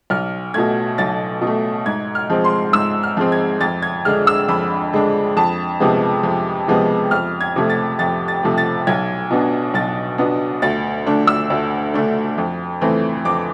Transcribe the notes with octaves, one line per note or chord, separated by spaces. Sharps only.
B1 F6
B2 A3 G#6
B1 A6
B2
A3
G#2 G#6
F6
F3 G#3 C4
C6
G#2 E6
F6
F3 G#3 C4
G#6
F2 A6
G#6
D3 G#3 D4 F6
E6
F2 B5
D3 G#3 D4
F2 A5
C3 F3 G#3 B3
F2
C3 F3 G#3 B3
F2 F6
G#6
C3 F3 A3
A6
F2 A6
A6
C3 F3 A3
A6
B1 G#6
B2 B3 D4
B1 A6
B2 B3 D4
D2 A6
D3 A3 D4
E6
D2
D3 A3 D4
F2
E3 A3 C4
F2 D6